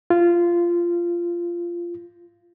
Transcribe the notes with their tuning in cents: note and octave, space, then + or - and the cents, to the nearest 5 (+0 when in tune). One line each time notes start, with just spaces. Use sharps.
F4 -15